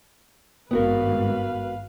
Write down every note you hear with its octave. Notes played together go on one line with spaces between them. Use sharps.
G#1 G2 B3 F#4 A#4 B4 F5